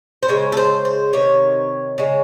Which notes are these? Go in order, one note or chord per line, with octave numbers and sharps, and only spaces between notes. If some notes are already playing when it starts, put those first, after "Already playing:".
C5
C#3 G#3 C#5
A4
C5
C5
C3 D#3 C#5
C#3 G#3